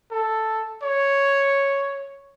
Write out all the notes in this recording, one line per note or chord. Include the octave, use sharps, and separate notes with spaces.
A4
C#5